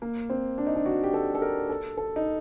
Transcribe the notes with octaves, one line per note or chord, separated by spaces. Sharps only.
A#3
C4
D4
D#4
D4
F#4
G4
A4
A4
A#4
A4
A4
D#4